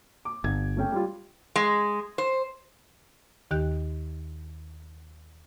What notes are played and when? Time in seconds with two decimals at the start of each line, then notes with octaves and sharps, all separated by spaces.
0.25 D6
0.44 G1 G#6
0.77 A3 C#4 G5
0.92 G3 F4
1.56 G#3
2.18 C5
3.51 D#2 D#3 G4 F#6